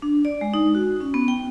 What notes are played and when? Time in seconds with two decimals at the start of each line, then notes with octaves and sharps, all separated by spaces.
0.02 D4
0.25 D5
0.41 G#3
0.54 D#4
0.75 F#4
1.01 C#4
1.14 B3
1.28 G5